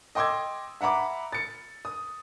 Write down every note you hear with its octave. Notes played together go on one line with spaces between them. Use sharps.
D#5 G5 C6 D6 E6 G#6
E5 F#5 A#5 B5 D6
A6 C#7
D#6